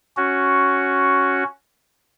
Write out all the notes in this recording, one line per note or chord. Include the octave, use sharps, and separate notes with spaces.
C#4 F#4